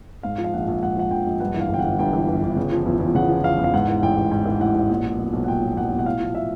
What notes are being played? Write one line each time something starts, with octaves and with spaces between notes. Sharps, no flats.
G#2 F5
F3
F5
A#1 F#5
A#1
G#2 F#5
F3 F#5
A#1 G5
A#1
G2 F#5
E3
F5
G1 G5
G1 F#5
G2 G5
E3
G1
G1
C#3
F3
E2
E2
C#3 F#5
F3
E2 F5
E2
F5
G#2 F#5
E3
A1 G5
A1
G#2 G5
E3
A1 F#5
A1
A#2
F3
B1
B1
F#5
A#2 G5
F3
B1 F#5
B1
F#5
A2 F5
F3
E5